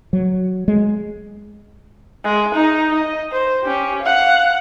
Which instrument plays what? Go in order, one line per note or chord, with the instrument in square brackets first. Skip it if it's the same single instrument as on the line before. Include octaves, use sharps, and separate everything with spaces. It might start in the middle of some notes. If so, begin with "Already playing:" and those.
[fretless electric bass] F#3
G#3
[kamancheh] G#3
D#4 D#5
D#5
C5
C#4 G4
F5 F#5